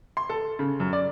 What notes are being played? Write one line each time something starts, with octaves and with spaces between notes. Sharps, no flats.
C6
A4
C#3
F#2
D5